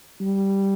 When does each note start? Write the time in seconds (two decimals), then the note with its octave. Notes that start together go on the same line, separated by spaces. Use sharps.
0.21 G3